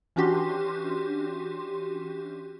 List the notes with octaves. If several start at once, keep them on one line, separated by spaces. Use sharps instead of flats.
E3 C#4 D4 F#4 G4 C6